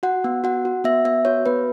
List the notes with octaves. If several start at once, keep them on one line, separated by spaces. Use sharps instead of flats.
F#4 F#5
B3
F#4 F#5
F#4
B3 E5
B3 E5
F#4 C#5
B3 B4